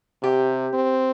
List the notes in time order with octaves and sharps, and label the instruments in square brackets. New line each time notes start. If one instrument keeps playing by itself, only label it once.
[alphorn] C3 [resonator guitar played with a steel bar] G4
[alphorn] C4